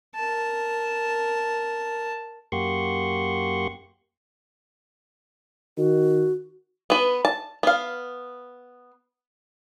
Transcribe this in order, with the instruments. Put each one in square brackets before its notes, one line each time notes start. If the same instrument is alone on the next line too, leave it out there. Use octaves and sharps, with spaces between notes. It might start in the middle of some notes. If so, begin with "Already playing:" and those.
[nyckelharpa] A#4 A5
[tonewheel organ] F#2 A#3 G4 F#5 C6 C#6
[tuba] D#3 [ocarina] F#4
[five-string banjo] B3 B4
A5
B3 F5